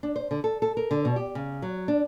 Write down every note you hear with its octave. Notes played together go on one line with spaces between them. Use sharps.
D4
C5
D3
A4
A4
A#4
D3
B2
G4
C#3
F#3
D4